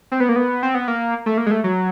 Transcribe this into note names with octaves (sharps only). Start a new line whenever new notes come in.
C4
B3
A#3
B3
C4
B3
A#3
A3
A#3
G#3
A3
F#3